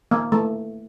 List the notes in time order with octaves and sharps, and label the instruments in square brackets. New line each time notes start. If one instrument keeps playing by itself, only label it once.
[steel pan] A#3
A3